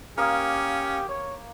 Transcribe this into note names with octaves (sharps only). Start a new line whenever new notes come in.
A#3 C#4 G4 F5 D#6 F6
C#5